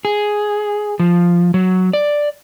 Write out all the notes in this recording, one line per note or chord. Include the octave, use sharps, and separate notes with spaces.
G#4
F3
F#3
D5